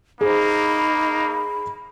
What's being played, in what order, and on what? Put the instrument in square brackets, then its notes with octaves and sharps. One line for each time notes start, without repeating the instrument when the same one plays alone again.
[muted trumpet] A#3 [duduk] D#4 [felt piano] G#4 C5 [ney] B5